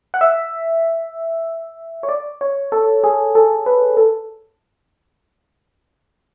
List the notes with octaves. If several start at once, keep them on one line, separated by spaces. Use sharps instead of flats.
F#5
E5
C#5
D5
C#5
A4
G#4
A4
B4
A4